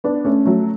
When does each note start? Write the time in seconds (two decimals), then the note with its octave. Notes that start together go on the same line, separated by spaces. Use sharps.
0.04 B3 D4
0.25 A3 C#4
0.45 F#3 A3